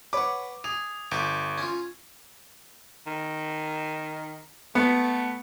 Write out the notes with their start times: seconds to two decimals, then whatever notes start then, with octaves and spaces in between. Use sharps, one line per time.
0.13 B4 C#5 F#5 B5 D6
0.64 G#4 F7
1.11 G1 G4 D6
1.58 C#4 F4
3.06 D#3
4.75 A3 B3